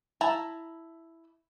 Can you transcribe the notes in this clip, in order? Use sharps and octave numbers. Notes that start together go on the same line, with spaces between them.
E4 A5 A#5